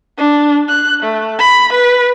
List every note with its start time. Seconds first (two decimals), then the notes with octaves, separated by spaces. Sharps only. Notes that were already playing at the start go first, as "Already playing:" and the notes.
0.18 D4
0.68 F#6
1.03 A3
1.39 B5
1.73 B4